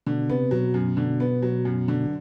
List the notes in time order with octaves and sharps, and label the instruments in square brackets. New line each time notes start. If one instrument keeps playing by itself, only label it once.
[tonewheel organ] B2 [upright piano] D3
[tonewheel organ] C3 [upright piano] B3
[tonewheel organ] B2 [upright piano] F#3
[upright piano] F#2
D3
B3
F#3
F#2
D3